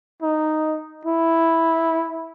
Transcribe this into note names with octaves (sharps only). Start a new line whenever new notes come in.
D#4
E4